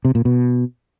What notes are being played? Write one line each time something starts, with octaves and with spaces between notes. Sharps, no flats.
C3
A#2
B2